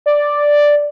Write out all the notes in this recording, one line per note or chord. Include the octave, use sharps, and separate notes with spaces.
D5